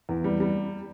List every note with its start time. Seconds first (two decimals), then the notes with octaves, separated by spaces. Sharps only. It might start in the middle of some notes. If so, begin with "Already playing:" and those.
0.09 E2
0.24 G3
0.40 G3